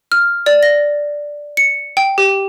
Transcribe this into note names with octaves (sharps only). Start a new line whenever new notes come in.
F6
D5
A#6
C#7
G5
G4